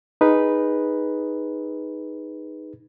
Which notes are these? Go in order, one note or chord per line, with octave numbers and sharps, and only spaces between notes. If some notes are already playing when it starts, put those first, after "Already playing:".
D#4 G#4 B4